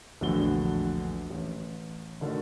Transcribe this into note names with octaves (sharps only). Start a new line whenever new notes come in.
A#1 E2 A2 D3 F#4 G7
A1
D3 D#3 A3 D4 F#4